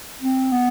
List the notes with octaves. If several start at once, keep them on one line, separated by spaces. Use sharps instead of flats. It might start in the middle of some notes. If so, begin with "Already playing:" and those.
C4
B3